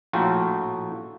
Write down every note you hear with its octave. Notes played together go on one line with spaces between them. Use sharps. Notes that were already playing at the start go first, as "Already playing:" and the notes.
A#1 A2 F4 F#4 G5